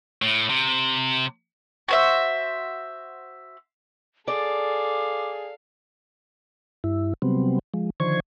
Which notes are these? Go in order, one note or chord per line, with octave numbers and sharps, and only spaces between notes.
A2
C3
F#4 C5 E5
G#4 A4 D5 F5 D6
G2 E4
C3 F#3 G3 B3 C4
F3 G#3
D3 D#3 F3 C5 C#6 G#6